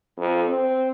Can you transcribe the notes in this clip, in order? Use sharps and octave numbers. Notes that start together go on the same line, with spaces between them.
F2
C4